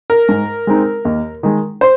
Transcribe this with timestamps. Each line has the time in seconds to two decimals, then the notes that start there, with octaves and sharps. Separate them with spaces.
0.10 A#4
0.29 G#2
0.67 G#3 C4 D#4
1.05 D#2
1.43 D#3 G#3
1.81 C5